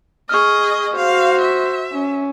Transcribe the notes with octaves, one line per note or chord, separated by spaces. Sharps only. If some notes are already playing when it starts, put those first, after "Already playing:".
G#4 D#5 C#6 F6
F#4 C5 F5
E5
C#4